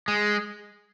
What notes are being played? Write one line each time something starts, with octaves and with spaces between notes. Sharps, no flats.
G#3